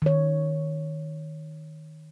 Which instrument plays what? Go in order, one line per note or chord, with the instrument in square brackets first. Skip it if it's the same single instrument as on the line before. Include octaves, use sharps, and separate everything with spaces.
[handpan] D#3 C#5